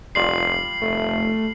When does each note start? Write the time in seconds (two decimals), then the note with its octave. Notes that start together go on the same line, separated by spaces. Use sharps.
0.15 F1 G3 F4 C7 F#7
0.82 F1 A3